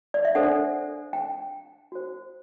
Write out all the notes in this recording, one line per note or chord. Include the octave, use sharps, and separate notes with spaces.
D5
E5
D4 A4 C5 F#5
G5
F#4 C5